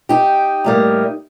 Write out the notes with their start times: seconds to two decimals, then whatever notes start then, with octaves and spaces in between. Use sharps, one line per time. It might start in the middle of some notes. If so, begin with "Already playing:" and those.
0.09 D#4 G4
0.64 A2 G3 A#3